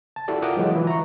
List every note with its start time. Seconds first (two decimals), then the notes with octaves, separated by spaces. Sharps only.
0.16 A5
0.28 E4 F#4 G4 A4 D5
0.42 F4 A#4 F#5 G5 D6 D#6
0.57 E3 F#3 G#3
0.73 E3 E4 F4
0.87 A#5 C#6